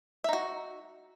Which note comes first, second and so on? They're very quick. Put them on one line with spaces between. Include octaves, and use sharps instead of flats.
E5 D#4 F#4